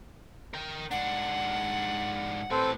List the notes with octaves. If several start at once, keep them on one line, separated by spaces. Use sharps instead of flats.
A#4 G5
G#2 D4 F#5
A2 C4 A4 B4 C5